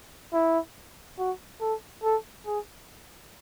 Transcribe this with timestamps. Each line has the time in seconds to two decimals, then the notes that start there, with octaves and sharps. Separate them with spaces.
0.33 E4
1.18 F#4
1.61 A4
2.03 A4
2.46 G#4